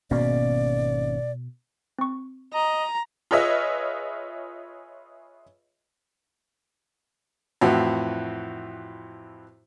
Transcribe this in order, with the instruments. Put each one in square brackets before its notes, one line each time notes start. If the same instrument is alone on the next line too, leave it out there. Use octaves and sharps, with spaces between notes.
[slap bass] G#1 A#3 C#4 [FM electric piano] B2 [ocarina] D5
[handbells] C4 C#6
[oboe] D#5 [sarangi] A#5
[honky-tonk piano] F4 G#4 B4 C#5 D#5 E5
[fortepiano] F2 A2 E3 F#4